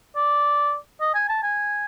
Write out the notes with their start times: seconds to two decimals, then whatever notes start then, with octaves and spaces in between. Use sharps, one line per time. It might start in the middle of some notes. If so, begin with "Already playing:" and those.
0.16 D5
1.01 D#5
1.15 G#5
1.29 A5
1.43 G#5